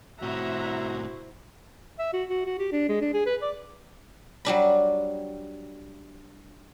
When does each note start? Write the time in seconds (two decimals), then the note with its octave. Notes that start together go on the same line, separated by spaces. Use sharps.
0.22 A2 C3 E4 F#4 C5 E5 F#5 A#5
1.99 E5
2.13 F#4
2.30 F#4
2.46 F#4
2.59 G4
2.72 D4
2.89 G#3
3.01 D4
3.14 G#4
3.26 B4
3.42 D5
4.45 F#3 G3 D4 B5